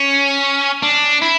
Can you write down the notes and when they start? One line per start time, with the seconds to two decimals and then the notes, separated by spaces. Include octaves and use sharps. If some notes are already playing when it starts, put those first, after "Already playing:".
Already playing: C#4
0.83 D4
1.22 E4